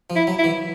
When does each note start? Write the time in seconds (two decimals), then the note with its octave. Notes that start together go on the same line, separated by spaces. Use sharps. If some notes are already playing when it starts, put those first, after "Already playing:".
0.10 F3
0.16 E4
0.27 F#3
0.39 E4
0.44 E3